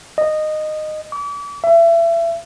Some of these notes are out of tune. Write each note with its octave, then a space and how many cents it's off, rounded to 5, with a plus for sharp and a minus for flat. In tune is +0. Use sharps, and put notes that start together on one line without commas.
D#5 -15
D6 -40
E5 +30